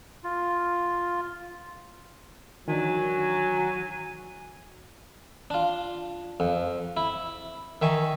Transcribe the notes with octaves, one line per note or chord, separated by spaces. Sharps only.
F4
D#3 E3 F#3 D4 G#5
D4 F4
F2
E4
D#3 E5 G#5 C#6